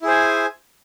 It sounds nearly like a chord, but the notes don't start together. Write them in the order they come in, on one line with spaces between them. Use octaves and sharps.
E4 G#4 C5 G#5